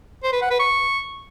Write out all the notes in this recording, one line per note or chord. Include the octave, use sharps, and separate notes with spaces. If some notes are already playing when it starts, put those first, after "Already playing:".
C5
B4
F#5
B4
C#6